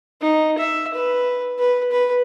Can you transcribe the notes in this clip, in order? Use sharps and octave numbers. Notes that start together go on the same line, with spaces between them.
D#4
E5
B4
B4
B4